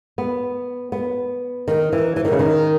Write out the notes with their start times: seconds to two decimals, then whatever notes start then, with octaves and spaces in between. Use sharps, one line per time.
0.18 B3
0.92 B3
1.68 D#3
1.93 E3
2.16 E3
2.25 D#3
2.32 C#3
2.39 D#3